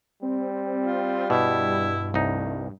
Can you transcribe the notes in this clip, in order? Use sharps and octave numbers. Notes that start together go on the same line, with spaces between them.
G3 C4
F4
G2 B2 E4
C2 A3 D#4